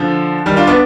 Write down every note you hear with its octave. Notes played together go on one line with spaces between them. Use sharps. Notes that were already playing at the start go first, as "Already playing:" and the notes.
Already playing: D3 F3
D#3 G3
D4 F4
B3 D4